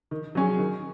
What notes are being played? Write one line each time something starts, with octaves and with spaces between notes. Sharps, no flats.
D#3
F#3 C#4 G#4
D#3